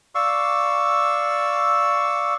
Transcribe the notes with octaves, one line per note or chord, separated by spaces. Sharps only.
D5 F5 C#6 E6